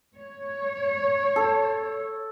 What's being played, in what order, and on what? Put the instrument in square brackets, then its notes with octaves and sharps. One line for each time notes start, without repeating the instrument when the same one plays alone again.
[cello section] C#5
[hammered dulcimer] A4